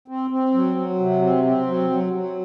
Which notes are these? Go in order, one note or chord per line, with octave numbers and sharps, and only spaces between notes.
C4
C4
F#3
F#3
C3
C4
C4
F#3
F#3
F#3